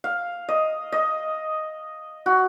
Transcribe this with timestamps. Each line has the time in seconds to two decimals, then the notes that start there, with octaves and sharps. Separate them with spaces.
0.04 F5
0.49 D#5
0.92 D#5
2.26 F#4